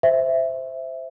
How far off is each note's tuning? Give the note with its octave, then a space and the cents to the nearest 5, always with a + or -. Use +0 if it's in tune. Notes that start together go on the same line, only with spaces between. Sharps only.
C5 -10 E5 +0